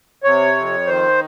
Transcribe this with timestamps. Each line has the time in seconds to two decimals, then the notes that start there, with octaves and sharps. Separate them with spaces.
0.24 C3 C#5
0.56 F2
0.87 D#3 C5